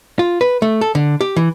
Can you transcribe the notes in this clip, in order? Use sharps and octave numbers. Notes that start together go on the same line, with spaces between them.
F4
B4
A3
A4
D3
G4
E3